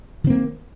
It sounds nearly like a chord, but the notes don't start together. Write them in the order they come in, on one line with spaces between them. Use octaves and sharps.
D#3 C4 A#3